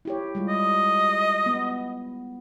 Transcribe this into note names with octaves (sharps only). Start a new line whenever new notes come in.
E4 G4 C#5
G3 G#3 F4
D#5
B3